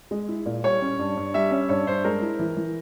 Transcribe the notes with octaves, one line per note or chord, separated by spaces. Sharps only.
G#3
E4
A#2
G3 C#5
C#4
G2
G2
G3 E5
C#4 E5
G2 C#5
G2 C5
G#3 A#4
E4
E3
E3